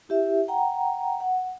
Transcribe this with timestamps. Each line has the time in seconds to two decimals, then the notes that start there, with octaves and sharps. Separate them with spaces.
0.09 E4 G4 E5
0.48 F#5 G5 A#5
1.20 F#5